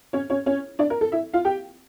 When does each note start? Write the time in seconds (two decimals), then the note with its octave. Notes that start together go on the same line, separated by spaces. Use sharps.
0.13 C#4 C#5
0.30 C#4 C#5
0.46 C#4 C#5
0.79 D4 D5
0.90 A#4
1.01 A4
1.12 E4 E5
1.34 F4 F5
1.45 G4 G5